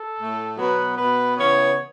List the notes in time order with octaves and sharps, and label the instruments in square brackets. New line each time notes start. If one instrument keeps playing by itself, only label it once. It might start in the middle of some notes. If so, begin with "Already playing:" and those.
Already playing: [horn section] A4
A2 A3
B2 F#3 B3 B4
B2 B3 B4
C#3 E3 B3 C#5